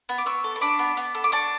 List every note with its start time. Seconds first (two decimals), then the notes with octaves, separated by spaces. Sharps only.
0.09 B3
0.18 D6
0.26 B3 C#6 E6
0.44 A4
0.56 C#6
0.61 D4 B5 D6
0.79 B3
0.97 B3
1.15 A4
1.24 D6
1.32 D4 A5 C#6